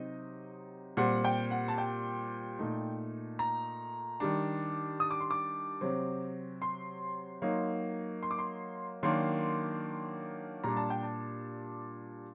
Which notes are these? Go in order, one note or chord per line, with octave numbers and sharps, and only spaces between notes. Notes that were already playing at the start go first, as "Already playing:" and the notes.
Already playing: C3 F#3 C4 D#4 D#5
A#2 G3 C4 F#5
G5
F#5
A5
G5
A#2 A3 D#4
A#5
D#3 G3 D4
D#6
D6
C6
D6
C3 F#3 C4
C6
F#3 A#3 D#4
C6
D6
C6
D#3 F#3 A#3 D4 C6
A#2 G3 D4 A#5
A5
G5
A5